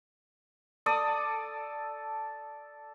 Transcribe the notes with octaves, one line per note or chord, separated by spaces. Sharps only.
A4 D5 D#6